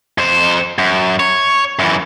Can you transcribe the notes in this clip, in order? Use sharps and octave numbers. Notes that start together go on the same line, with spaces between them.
F2 C5
F#2
C#5
F#2 E3